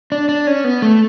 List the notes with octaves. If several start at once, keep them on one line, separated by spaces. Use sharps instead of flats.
D4
D4
C#4
B3
A3